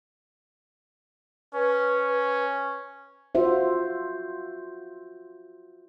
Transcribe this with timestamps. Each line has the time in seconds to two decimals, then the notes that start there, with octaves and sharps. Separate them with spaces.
1.54 C#4 B4
3.35 F4 F#4 C5 E5